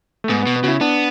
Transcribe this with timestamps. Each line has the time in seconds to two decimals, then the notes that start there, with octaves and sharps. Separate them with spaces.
0.24 A3
0.29 G#2 B3
0.43 B2 B3
0.56 B3
0.63 C#3 F#4
0.68 E4
0.81 B3 D4